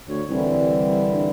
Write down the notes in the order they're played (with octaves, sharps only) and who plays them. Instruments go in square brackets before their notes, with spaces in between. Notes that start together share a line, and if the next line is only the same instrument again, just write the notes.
[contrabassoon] D2 [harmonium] C#5
[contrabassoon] C2 [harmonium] D3 E3 G3
[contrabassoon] G2